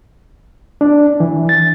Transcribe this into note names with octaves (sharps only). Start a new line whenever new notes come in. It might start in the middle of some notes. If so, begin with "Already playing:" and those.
D4
E3
A6